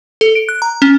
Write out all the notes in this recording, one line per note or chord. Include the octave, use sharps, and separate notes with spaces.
A4
D7
F#6
A#5
C#4